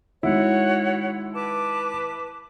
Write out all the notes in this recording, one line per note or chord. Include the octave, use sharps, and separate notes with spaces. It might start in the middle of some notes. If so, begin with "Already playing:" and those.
D#3 G#3 E4 F#4 C#5 F#5
B4 A5 D6